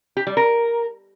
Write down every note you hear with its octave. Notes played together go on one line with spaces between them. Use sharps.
G4
G3
A#4